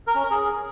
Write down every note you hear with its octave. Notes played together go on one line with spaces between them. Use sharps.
A#4
C#4
A#4
G#4